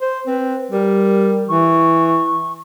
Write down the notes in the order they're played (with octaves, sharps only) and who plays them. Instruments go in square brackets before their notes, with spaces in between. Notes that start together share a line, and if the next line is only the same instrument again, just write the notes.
[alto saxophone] C5
[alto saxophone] C4 [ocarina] B4
[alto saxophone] G3 [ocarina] A#4
[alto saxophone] E3 [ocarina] C#6